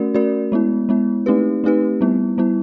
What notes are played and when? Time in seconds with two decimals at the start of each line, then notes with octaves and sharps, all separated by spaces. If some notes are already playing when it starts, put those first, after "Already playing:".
Already playing: A3 C#4 F#4 A#4 D5
0.15 A3 C#4 F#4 A#4 D5
0.52 G#3 B3 E4
0.89 G#3 B3 E4
1.26 A3 C4 D#4 G4 B4
1.64 A3 C4 D#4 G4 B4
2.01 G3 B3 E4
2.38 G3 B3 E4